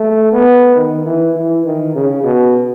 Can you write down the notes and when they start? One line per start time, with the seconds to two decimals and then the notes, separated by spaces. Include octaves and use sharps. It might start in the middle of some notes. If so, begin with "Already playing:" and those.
Already playing: A3
0.32 B3
0.76 D#3
1.06 E3
1.36 E3
1.65 D#3
1.95 C#3
2.23 B2